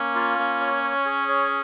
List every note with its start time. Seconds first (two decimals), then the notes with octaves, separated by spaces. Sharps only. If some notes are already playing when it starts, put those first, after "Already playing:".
Already playing: A#3 C#4
0.15 F4
0.39 A#3
0.60 C#5
0.84 C#5
1.05 G#4
1.29 C#5